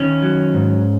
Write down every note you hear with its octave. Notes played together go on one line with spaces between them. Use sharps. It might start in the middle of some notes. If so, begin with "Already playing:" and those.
Already playing: D#3 C#4
F#3
G#2